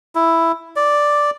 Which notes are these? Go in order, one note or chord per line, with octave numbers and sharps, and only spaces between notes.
E4
D5